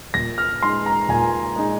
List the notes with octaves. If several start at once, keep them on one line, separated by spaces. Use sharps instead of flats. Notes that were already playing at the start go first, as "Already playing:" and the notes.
A#2 A#6
F6
G#3 D#4 C6
A#5
A#2 G#5
G#3 D#4